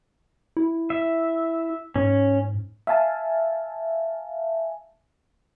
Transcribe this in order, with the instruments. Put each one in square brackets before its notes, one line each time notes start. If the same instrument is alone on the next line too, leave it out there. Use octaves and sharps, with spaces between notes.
[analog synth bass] E4
[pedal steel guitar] E5
[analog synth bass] G#2 [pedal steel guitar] C#4
[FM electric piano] E5 F5 G#5 A5